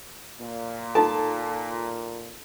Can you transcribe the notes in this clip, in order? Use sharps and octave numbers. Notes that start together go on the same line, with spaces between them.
A#2
D#4 F4 A4 A5